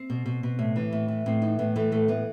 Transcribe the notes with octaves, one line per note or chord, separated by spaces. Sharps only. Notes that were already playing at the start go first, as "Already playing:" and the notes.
Already playing: C4
B2
B2
B2
A2
E3
A2
E3
A2 C4
E3 D#4
A2 B3
E3 A3
A2 A3
E3 B3